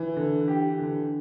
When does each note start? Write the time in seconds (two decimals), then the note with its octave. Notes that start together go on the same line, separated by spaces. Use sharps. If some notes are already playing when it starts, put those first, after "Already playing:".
Already playing: E3
0.17 D3
0.48 G4
0.79 D3